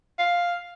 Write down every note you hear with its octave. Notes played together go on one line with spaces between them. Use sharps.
F5